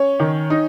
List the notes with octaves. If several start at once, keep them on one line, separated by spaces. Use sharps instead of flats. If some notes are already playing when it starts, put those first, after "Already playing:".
Already playing: C#4 C#5
D#3
D#4